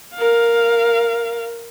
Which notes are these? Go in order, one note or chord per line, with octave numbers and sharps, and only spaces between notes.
A#4 F5